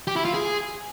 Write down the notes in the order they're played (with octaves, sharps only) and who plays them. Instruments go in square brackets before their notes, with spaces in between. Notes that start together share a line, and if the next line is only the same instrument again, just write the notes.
[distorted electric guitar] G4
E4
F4
G#4